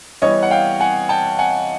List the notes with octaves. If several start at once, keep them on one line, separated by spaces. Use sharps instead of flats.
E3 G3 B3 C#5 D#5
F#5
F5 G5
F#5 G#5
G5 A5
F#5 G#5